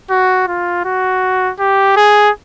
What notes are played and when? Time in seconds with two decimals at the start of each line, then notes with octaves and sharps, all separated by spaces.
0.10 F#4
0.48 F4
0.85 F#4
1.59 G4
1.96 G#4